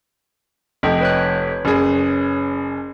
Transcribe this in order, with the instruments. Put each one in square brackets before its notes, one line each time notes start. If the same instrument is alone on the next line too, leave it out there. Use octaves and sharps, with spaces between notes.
[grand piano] F1 [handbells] A4 D#5 G5
[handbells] B4 C#5 F#6
[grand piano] F#1 G#4